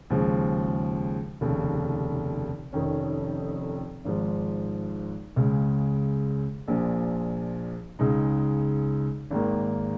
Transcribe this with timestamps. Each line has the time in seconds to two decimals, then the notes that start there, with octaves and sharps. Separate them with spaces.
0.10 D#2 C#3 F3 G#3
1.41 F1 D#2 C#3
2.73 F1 F2 D#3 C#4
4.05 G#1 G#2 F3
5.36 C#2 C#3 G#3
6.68 A#1 A#2 F3
7.99 C#2 C#3 G#3 D#4
9.31 G#1 G#2 D#3 A#3